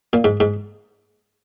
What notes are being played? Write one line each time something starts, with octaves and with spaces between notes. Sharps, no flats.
A#2
G#2
G#2